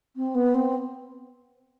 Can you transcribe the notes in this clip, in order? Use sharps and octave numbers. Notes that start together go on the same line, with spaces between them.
C4
B3
C4